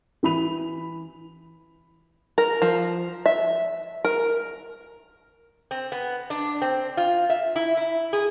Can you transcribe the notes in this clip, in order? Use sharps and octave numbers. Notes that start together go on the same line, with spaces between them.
E3 B5 F7
A#4
F3
E5
A#4
C4
B3
D4
C4
F4
E5
E4
E4
G#4